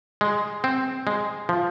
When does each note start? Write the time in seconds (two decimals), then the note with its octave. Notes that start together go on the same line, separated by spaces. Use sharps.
0.21 G#3
0.64 C4
1.07 G#3
1.49 F3